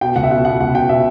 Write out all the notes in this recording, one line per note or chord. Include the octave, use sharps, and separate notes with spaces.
B2 G5
C#2 F#5
E5
B2 F#5
B2 F#5
C#2 F#5
B2 G5
B2 E5